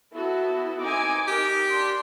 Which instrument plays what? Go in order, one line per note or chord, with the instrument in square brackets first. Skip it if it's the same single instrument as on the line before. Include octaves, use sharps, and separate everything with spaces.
[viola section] B3 F#4 A4 [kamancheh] E4
[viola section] C4 D#4 G#5 [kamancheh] D6
[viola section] D#4 A#4 G5 [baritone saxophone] G4
[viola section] D4 [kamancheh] C6